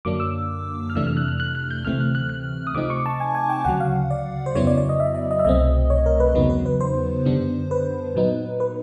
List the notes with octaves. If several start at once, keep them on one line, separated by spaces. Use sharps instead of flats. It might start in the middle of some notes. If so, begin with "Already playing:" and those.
F#2 D3 F#3 A#3 D4 D6
E6
F6
F2 C3 E3 A3 D4 E6
F6
F#6
F6
F#6
F#6
G6
D2 C3 E3 A3 C4 F6
F#6
F#6
F#6
D#6
C3 F3 A3 C4 D#4 D6
C#6
A5
G#5
G#5
G5
D2 C#3 F#3 F#5
F5
D5
C5
F2 C#3 F#3 B3 E4 C#5
D5
D5
D#5
E5
D#5
D#5
E5
C2 B2 F#3 A3 C4 D#5
C#5
A#4
B4
E2 C#3 F#3 B3 D#4
B4
B4
C5
F#2 D3 G3 B3 D4
B4
A#2 F#3 B3 D#4
B4